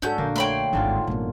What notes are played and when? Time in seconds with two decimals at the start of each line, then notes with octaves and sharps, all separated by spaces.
0.02 G#2 C#4 D4 F#4 A4 G6
0.18 A#1 D3 A#3
0.36 A3 C#5 G5 B5 C6
0.73 D1 G#1 G#2 D3 F4
1.07 A1 F#2 B2 A#3